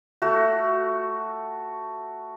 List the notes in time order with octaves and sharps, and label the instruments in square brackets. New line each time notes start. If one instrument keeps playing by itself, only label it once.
[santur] A3 F#4